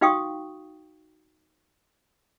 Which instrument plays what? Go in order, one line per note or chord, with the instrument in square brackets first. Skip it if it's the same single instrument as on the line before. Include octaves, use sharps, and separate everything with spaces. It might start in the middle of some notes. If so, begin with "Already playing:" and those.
[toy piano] D#4 F#4 F5 G5 C#6 D#6